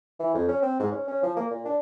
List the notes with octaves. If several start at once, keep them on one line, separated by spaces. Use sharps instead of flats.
E3
F2
C#4
C4
G#2
C#4
C#4
F3
A#3
A#2
D4